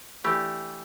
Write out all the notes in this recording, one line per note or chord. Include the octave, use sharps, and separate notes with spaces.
E3 A3 D4 G4